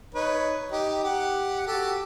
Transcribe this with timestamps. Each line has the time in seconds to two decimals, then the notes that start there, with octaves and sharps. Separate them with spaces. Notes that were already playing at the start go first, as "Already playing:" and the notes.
0.15 D#4 B4 C#5
0.72 D#4 G4
1.04 G4 F#5
1.67 F#4 G4 A4